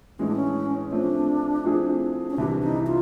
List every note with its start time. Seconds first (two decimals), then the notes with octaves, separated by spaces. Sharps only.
0.19 A2 E3 G#3 C#4
0.27 D4
0.36 C#4
0.92 F3 A3 C4 D4
1.64 F3 A3 C4 E4 G#4
2.30 C#4
2.37 C2 C3 E3 D4
2.62 D#4
2.87 F4